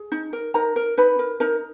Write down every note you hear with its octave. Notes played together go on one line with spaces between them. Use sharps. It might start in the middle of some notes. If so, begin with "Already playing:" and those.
Already playing: G#4
D#4
A#4
D#4 A#4 A#5
A#4
D#4 B4 B5
A#4
D#4 A#4 A#5